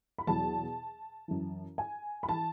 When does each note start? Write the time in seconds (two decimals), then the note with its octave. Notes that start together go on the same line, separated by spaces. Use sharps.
0.18 B5
0.27 E2 B2 F#3 A5
1.28 F#2 E3
1.78 G#5
2.23 B5
2.29 E3 A5